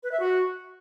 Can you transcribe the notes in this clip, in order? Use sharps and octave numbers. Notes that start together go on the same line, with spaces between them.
B4
E5
F#4